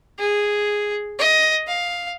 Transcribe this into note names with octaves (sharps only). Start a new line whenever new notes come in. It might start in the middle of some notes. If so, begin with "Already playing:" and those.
G#4
D#5
F5